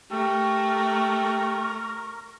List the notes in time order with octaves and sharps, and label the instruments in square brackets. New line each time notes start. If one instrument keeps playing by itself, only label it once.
[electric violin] A3 [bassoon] G4 [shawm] A#4 [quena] C#6